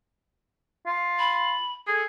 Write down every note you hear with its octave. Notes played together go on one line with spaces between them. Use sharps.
F4
B5
G#4 A4